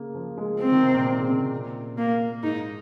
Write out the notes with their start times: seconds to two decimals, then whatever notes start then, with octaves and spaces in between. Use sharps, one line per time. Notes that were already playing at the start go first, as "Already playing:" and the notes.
Already playing: C#3 A#3
0.15 F3
0.38 G#3
0.60 F3 C4
0.72 D#3
0.83 C3
0.95 A#2
1.06 C3
1.18 C#3
1.29 C3
1.40 A#2
1.98 A#3
2.43 G#2 D#4